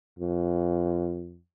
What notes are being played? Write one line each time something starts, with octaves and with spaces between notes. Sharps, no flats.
F2